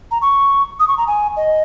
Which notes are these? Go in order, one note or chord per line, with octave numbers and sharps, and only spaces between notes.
A#5
C#6
D#6
C#6
A#5
G#5
D#5